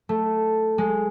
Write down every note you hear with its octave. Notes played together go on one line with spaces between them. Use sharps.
A3
G#3